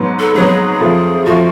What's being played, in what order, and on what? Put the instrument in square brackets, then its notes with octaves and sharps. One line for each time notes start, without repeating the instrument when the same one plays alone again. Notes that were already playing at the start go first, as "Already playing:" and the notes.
Already playing: [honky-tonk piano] G#2 F#3 B3
[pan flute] A4
[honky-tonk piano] G#2 F#3 B3 [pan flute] G#4
[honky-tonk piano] F2 F3 A3
[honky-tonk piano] F2 F3 A3 [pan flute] F#4